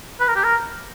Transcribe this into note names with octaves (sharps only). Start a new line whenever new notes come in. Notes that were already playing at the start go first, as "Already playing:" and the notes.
B4
A#4
G4
A#4